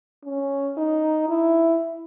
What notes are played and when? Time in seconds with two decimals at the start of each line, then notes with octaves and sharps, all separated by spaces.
0.25 C#4
0.78 D#4
1.29 E4